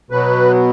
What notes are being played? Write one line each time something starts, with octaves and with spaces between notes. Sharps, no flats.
B2 F#3 B3 B4